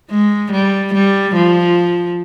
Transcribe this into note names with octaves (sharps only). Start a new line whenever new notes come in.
G#3
G3
G3
F3